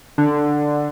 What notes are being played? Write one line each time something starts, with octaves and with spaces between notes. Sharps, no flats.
D3